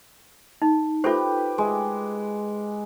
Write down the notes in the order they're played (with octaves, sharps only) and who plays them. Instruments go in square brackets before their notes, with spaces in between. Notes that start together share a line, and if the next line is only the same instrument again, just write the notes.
[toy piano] D#4
[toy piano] F4 A4 C5 [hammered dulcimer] G4 B4 D6
[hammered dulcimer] G#3